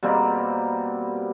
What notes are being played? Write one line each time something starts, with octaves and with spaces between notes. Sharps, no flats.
B2 G3 A#3 C4